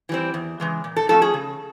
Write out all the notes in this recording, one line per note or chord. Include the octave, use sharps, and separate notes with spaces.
E3 G3 C4
E2
C#3 E3 G#3
A#2
A4
F3 A3 C#4 A4
G#4
C#3